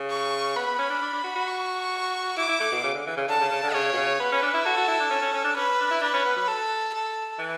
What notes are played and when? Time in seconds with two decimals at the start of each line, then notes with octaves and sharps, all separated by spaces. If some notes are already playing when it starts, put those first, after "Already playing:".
Already playing: C#3
0.10 C#6
0.56 B3 B5
0.67 B3
0.79 C#4
0.90 D4
1.02 D4
1.13 D4
1.24 F#4
1.35 F#4
1.47 C#6
2.37 E4 D6
2.49 E4
2.60 A3
2.72 B2
2.84 C#3
2.94 D3
3.06 E3
3.17 C#3
3.28 D3 A5
3.40 C#3
3.51 C#3
3.63 D3
3.74 C#3 C#5
3.93 B2
3.97 C#3
4.19 B3 B4
4.32 C#4
4.42 D4
4.54 E4
4.65 F#4 A4
4.77 F#4
4.88 E4
5.00 D4
5.10 C#4
5.22 C#4
5.34 C#4
5.44 D4
5.56 C#4 B4
5.79 D4
5.91 E4
6.02 D4 B4
6.13 C#4
6.25 B3
6.36 F#3
6.48 A4
6.93 A4
7.39 E3